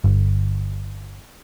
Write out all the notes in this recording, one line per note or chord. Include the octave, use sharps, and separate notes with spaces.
G1